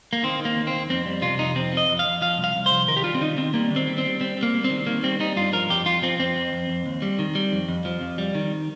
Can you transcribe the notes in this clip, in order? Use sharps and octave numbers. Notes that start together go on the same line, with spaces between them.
A#3
D#3 C4
D#3
A#3
D#2
C4
D#2
F2 C4
G3
C3 F4
F2 D#4
F2 C4
F3
D#5
F2
F5
F2
F3 F5
C2
F5
C2
C5
F3
D#3 A#4
G4
G3 F4
C4
D#3 D#4
D#3 C4
G3 A#3
D#3
C4
G3
C4
G3
G3 C4
G3
A#3
G3
C4
D#3
D#3 A#3
G3 C4
G3 D#4
G2 F4
F3 A#4
F2 G4
F2 F4
F3 C4
F2 C4
F2
F2
F2
D#2
G3
D#3
G3
F2
F2
F3
F2
G3
D#3